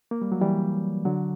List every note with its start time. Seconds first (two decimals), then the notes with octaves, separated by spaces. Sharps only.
0.11 A#3
0.22 G3
0.32 F#3
0.41 E3 G3
1.05 D3 F#3